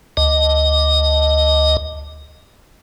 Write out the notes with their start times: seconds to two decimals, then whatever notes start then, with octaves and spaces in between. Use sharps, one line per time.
0.17 D2 D#5